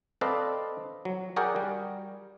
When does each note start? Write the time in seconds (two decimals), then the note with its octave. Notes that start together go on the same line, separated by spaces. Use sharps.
0.21 C4 A4 B4 D5 D#5 F5
1.05 F#3
1.36 F#4 G#4 A#4 D5 F#5 G5
1.56 G3